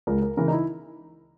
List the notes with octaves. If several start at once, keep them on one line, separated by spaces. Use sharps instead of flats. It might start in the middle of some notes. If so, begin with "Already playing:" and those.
C#2 A#4
A#4
C#3 E3 A#4
D#4
E4